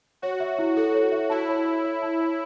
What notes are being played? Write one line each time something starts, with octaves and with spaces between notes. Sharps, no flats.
F#4 C#5
E5
E4
F#4 A4
C#5
E5
E4 A5
C#5
C#5
E5
A5
C#5